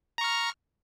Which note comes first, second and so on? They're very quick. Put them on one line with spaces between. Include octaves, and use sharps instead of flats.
A#5 C#6 F6